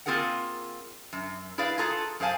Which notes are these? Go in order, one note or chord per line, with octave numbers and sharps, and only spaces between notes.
A#3 C4 F4 G#4 A#4 F#5
F#2
E4 G#4 B4 D5 F5
F4 F#4 G#4 A4 A#5
F#2 G#4 C5 F5 G#5 A5